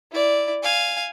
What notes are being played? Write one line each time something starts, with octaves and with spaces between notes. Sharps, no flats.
E4 D5
F5 G#5